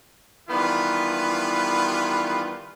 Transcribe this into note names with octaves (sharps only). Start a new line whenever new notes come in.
D#3 E3 G3 B3 F4 B4